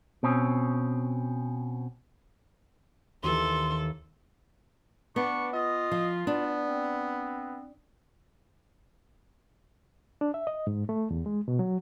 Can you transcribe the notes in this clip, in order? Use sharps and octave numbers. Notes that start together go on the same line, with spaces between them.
B2 C4 C#4
D#2 E3 A4 C6
B3 D4 C#6
F4 D#5
F3
B3 D4
C4
D4
E5
D#5
G#2
A3
E2
G#3
B2
F#3